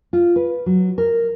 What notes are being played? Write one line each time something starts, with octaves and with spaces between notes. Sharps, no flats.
F4
B4
F#3
A#4